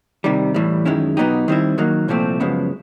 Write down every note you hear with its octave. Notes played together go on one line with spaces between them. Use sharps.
C3 D#3 G3
A2 E3 G3
F#2 D#3 G#3 C#4 E4
B2 F#3 B3 D#4 G4
D#3 G3 C4 E4
D#3 F#3 A#3
C2 A#2 F3 A3 C4
F#2 C#3 F3 G#3 B3